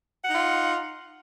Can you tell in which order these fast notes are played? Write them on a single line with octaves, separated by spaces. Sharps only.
F#5 D#4 F4